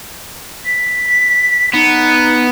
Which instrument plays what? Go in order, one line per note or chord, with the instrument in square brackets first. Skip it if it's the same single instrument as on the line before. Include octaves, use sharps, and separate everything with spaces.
[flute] B6
[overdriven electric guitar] B3 [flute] D#4